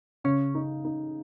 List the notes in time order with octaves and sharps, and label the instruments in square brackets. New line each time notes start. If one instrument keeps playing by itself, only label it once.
[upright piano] C#3 [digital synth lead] C#4
[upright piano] D#4
D#4